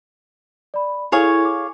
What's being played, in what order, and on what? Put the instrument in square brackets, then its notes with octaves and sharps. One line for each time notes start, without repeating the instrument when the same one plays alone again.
[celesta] D5 B5
[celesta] E4 A4 C#6 [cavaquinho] G#4 C#5 F5
[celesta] D6